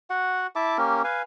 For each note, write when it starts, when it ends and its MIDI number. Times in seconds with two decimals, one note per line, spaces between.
0.10 0.47 66
0.10 0.47 78
0.56 0.78 64
0.56 0.78 76
0.56 0.78 81
0.56 0.78 86
0.78 1.02 58
0.78 1.02 61
0.78 1.02 67
0.78 1.02 70
1.04 1.22 71
1.04 1.22 77
1.04 1.22 80